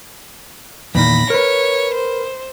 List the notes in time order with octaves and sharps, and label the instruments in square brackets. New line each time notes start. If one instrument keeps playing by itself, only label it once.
[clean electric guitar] E2 A#2 D#3 [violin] B5 A#6
[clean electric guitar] A#4 B4 [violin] C#5
[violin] C5